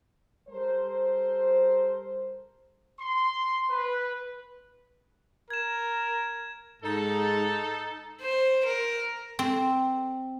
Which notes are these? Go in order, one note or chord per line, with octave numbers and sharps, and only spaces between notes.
G3 A4 A#4 C5
C6
B4
A#4 G#6 E7
G#2 D#4 A4
C5
A#4
C4